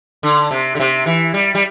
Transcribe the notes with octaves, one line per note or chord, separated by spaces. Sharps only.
D3
C3
D3
C3
E3
G3
G3